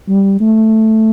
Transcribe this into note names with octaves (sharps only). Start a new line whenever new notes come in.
G3
A3